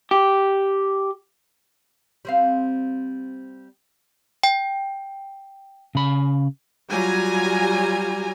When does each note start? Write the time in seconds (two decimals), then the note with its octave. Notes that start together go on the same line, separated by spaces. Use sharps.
0.11 G4
2.25 G3 C4 F5
4.43 G5
5.95 C#3 B5
6.88 F#3 G3 F4 G#5 A#5